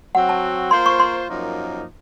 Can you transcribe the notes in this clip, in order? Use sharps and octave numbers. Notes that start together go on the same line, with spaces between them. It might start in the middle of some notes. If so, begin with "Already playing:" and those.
F#3 C4 F#4 F#5
A5
A#3 F4 C5 C6
C#6
C6
F#2 F3 A#3 D#4